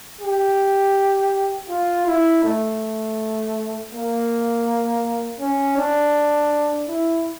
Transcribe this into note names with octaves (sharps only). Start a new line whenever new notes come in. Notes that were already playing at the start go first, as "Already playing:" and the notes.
G4
F4
E4
A3
A#3
C#4
D4
E4